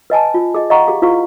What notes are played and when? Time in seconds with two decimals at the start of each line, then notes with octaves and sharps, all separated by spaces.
0.10 B4 D#5 G#5 A5
0.34 F4
0.55 G#4 D#5
0.70 D#5 F5 F#5 A#5 C#6
0.87 G4 G#4 F5
1.02 E4 F4 B4 F5 C#6